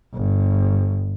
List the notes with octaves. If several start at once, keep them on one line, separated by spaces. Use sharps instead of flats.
G1